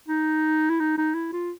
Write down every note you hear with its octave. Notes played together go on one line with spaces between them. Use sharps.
D#4
E4
D#4
D#4
E4
F4